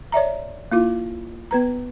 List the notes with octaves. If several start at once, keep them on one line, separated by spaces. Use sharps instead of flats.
C#5 D5 E5 A#5
A#3 E4 F4
B3 B4 A#5